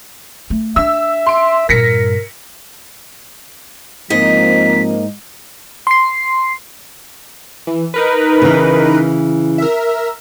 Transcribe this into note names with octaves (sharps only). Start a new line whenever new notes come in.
A3
D4 E5 E6
C6 D7
G2 A#2 A#4 A#6 B6 C#7
G#2 F3 A#3 C4 D#5 B6
C6 C7
E3
D#4 A#4 B4
C#3 E3
A#4 E5